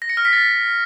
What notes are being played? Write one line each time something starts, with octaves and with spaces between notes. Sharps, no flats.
A#6
C#7
F6
B6
A6